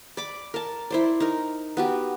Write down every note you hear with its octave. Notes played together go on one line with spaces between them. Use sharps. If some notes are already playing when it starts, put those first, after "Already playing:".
D5 B5 D6
A#4 A5
E4 C5 D5
D#4 A#4
B3 F#4 G4